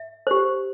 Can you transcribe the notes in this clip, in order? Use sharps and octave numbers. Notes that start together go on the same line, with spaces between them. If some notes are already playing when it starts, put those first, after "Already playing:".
Already playing: E5
G4 C5